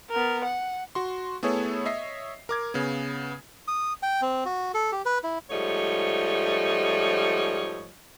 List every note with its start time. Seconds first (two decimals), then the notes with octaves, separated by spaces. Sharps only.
0.10 B3 A#4
0.44 F#5
0.95 F#4 C6
1.43 A3 B3 E4 G#4 A4 C#5
1.85 C#5 D#5 E5 C7
2.49 A#4 D6 G#6
2.74 C#3 B3
3.68 D#6
4.03 G5
4.22 C4
4.45 F#4
4.74 A4
4.92 G4
5.05 B4
5.24 E4
5.50 G#2 F3 G3 A3 C#5 D#5